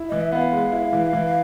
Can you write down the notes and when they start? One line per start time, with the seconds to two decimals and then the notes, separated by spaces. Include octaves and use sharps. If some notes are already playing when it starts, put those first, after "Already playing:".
Already playing: E4
0.09 E3 D#5
0.21 E5
0.32 B3 F5 F#5
0.52 G#3
0.72 E4
0.93 E3
1.13 E3